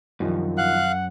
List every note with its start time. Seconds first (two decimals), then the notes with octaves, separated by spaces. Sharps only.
0.20 C2 F#2 D#3 F3
0.58 F5 F#5 F#6